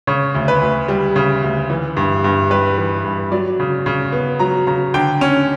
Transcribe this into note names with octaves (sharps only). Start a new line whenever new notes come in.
C#3 C#5
D2
B4
D2
G3
C#3
D2
E3
G2
G2
G3 B4
E3
G2
F#3 D5
C#3
C#3
B3
F#3 A#5
C#3 A#5
D3 G5
C#4